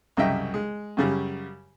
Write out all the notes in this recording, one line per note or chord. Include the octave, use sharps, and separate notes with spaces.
C2 F#2 C#3 D#5 E5 G5
G#3
F#2 C#3 G3